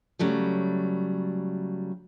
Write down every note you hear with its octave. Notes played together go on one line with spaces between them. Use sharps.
C#3 F#3 G3 A3